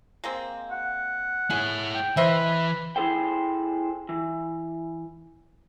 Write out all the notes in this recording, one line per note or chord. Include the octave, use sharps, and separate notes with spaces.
G#3 A#3 C4
F#5
E4 G#4 C#5
G5
E3 B4 C5 D#5 E5
E4 G#4 A4 C5 G5
E3